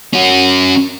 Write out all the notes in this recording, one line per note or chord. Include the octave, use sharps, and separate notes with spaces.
C#4 F#4